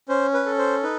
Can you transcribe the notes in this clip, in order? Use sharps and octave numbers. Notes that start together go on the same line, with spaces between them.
C#4 C5
B4
A4
C5
D#4 B4